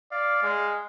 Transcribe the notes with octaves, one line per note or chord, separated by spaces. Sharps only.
D5 F5
G#3